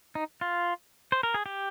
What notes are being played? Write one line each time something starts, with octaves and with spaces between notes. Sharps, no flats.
D#4
F4
C5
A#4
G#4
G4